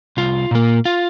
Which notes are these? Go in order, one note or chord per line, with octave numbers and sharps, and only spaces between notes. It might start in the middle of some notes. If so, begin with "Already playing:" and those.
C2 F4
A#2 A#3
F4